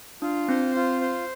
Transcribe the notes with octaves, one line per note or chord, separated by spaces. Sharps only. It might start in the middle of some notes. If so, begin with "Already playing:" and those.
D4 F4
C4 C5
F4
C5